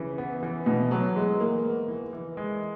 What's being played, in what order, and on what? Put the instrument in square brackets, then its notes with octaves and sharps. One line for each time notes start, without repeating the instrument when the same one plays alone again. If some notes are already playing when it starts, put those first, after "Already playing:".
Already playing: [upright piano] C#3 [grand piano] E3
[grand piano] B3
E3
[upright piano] B2 [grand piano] E3
[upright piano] F#3 [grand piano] B3
[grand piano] E3 [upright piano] G#3
[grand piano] E3 [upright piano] A#3
[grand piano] B3
E3
E3
G#3